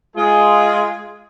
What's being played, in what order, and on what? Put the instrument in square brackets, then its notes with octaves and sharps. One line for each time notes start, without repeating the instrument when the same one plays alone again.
[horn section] G#3 F4 G#4